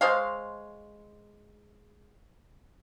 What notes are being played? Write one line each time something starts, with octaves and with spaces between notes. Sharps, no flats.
G#3 C5 C#5 F5